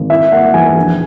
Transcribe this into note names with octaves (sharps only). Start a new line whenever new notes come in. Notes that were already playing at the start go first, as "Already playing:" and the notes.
Already playing: G#1
E4 E5
A#3 F#5
E2 G#5
A#1